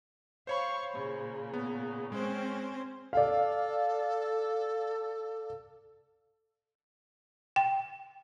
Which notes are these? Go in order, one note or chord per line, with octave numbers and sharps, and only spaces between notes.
C5 C#5 F5 B5 C#6
A#2 C#3
B3
G#3 C4 C#4 C5
A4 D5 F5
G5